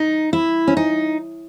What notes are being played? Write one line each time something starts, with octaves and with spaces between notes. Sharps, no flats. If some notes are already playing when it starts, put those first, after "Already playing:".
Already playing: D#4
E4
C#4
D#4